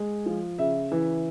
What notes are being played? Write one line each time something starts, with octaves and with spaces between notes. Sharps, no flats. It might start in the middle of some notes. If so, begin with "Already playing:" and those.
Already playing: G#3
F3
C#3 E5
E3